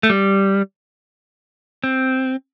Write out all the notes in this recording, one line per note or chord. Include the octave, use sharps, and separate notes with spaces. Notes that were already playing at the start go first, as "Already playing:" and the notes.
A3
G3
C4